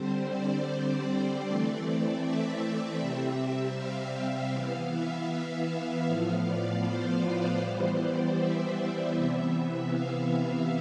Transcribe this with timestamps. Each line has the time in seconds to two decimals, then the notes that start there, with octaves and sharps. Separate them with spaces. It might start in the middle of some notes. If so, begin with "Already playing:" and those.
Already playing: D3 G3 C4 C5
0.30 D5
1.46 E3 A3 C4
2.23 E5
2.99 C3 G3 C4
3.76 F5
4.53 E3 B3 F5
4.91 E5
5.29 E5
5.68 F5
6.06 A2 F3 B3 F5
6.44 D5
6.83 C5
7.21 B4
7.59 E3 G3 B3 C5
7.98 D5
8.36 E5
9.13 C3 E3 B3
9.90 F5